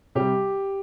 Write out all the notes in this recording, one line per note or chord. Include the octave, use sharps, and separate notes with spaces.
C3 G3 G4